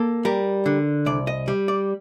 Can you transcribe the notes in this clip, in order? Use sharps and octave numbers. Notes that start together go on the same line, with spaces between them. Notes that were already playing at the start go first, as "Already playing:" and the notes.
Already playing: A#3 A4
G3 A#4
D3
C2 D5
D#5
G3
D5